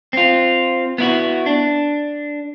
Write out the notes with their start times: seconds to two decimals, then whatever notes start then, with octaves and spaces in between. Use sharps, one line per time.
0.13 C4 F4
0.98 B3 E4 F#4
1.46 D4